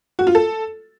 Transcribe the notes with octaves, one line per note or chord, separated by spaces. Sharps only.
F#4
F4
A4